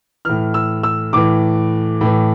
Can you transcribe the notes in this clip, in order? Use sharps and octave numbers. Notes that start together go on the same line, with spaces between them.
A2 E3 F6
E6
E6
A2 E3 D6
A2 E3